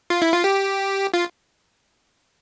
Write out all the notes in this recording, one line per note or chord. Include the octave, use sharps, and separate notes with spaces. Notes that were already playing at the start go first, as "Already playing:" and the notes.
F4
E4
F4
G4
F4